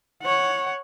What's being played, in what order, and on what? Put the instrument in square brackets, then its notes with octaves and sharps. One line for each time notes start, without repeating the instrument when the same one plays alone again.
[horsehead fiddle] C#5 F#5